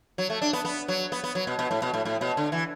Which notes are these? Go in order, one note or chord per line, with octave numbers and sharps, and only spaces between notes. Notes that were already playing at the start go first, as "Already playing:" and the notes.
F#3
A3
D4
B3
B3
F#3
B3
B3
F#3
B2
B2
A2
B2
A2
A2
B2
D3
E3